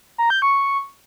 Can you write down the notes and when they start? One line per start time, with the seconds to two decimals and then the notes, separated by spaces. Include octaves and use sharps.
0.18 A#5
0.30 G6
0.42 C#6